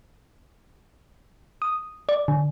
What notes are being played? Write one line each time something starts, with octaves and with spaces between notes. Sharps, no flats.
D#6
D5
D3